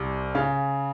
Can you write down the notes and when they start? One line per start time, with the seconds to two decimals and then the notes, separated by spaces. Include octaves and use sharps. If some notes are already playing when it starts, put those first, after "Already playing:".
Already playing: C2 C3
0.35 C#3 F5